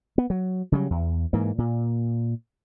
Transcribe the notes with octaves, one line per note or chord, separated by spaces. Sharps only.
B3
F#3
C#3 F#3 G3
E2
G#2 E3 A#3
A#2